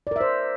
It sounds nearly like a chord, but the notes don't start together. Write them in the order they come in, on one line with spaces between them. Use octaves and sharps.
D5 A#4 E5 C5